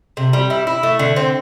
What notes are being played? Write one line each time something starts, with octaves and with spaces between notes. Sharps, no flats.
C3
G3
E4
E4
A3
D3
C4